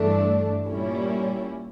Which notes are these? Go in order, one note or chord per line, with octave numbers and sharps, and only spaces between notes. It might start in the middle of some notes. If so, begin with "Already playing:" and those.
Already playing: G2 E3 A3 D4
A#2 G3 A#3 C#4 E4